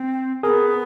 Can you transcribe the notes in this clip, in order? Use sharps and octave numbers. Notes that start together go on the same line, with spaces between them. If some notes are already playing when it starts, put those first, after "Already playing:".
Already playing: C4
C4 G#4 A#4
B3